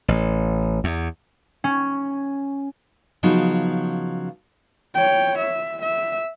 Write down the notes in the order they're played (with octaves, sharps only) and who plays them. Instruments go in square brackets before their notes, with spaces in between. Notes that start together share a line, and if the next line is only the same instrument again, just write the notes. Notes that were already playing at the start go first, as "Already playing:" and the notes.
[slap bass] A1
E2
[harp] C#4
[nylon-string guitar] C#3 F3 F#3 B3 D#4
[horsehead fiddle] C#5 G5
E5
E5